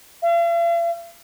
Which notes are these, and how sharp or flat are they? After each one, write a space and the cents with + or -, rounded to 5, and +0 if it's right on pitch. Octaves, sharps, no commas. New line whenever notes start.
F5 -45